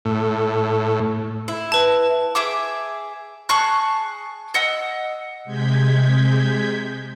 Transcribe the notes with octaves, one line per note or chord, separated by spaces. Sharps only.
A2
E4
B4 A5
G#4 E5 D6
G#4 A5 C#6 F#6
D#5 F#5 E6
C3 G#3 G6 G#6 B6